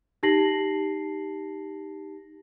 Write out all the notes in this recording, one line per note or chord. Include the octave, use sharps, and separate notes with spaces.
D#4 G4 A5 A#6 C7 F#7